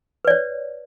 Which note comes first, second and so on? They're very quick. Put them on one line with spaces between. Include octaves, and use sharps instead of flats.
B4 D5 C#5